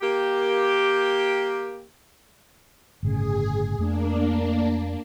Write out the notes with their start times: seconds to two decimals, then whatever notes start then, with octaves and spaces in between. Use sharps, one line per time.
0.01 A#3 G4
3.03 G1 A2 C#3 G#4
3.78 F2 A3 A#3 D4